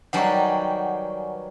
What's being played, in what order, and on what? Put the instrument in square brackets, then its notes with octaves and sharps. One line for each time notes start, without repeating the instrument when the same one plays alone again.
[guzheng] D#3 F#3 G3 [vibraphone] B4 D5 [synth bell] F#5 G#5 C#6